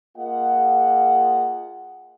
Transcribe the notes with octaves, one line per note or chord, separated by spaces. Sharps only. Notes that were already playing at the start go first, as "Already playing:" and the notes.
A#3 F4 G#4 D#5 F#5